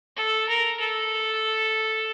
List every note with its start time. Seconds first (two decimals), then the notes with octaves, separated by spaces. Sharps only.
0.16 A4
0.48 A#4
0.80 A4